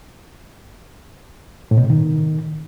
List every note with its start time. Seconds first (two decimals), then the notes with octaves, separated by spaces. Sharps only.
1.71 A2
1.77 B2
1.84 C3
1.90 D#3